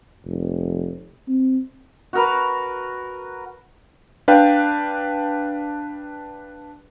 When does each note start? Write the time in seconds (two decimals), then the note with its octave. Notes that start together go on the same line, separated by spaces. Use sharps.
0.25 F1
1.28 C4
2.13 F#4 A#4 B4
4.28 D4 B4 F5 G5